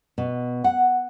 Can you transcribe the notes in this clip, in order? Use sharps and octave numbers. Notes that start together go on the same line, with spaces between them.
B2
F#5